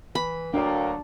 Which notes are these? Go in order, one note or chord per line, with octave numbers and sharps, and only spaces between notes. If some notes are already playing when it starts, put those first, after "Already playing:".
E3 B5
D2 F#3 A#3 D4 D5 G5